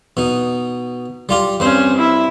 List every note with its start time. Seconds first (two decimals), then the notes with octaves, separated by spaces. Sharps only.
0.17 B2 D#4
1.29 G3 F4 G4
1.60 G2 C4 C#4 C5
1.97 E4 E5